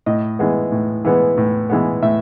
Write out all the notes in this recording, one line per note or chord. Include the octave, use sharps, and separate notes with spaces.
A2 D#5
E3 G#3 B3
A2
E3 G#3 B3
A2
E3 G#3 B3
A2 E5